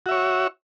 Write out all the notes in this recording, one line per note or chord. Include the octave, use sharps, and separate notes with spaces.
F#4 C#5 E5